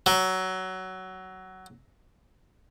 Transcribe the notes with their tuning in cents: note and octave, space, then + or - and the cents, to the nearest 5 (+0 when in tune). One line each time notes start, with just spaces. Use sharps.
F#3 +15